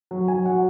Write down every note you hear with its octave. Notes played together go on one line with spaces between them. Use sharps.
F#3
F#3 G#5
F#3 F#5